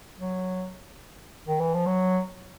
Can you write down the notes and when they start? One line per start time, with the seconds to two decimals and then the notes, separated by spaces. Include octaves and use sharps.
0.19 F#3
1.48 D#3
1.60 E3
1.74 F3
1.86 F#3